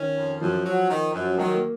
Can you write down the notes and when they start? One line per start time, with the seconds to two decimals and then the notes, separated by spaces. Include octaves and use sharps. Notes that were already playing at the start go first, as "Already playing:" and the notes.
Already playing: D#3 C#4
0.18 F2
0.41 F#2 F3
0.66 F#3
0.90 D#3
1.14 F#2
1.38 D#3 F#3
1.54 A#3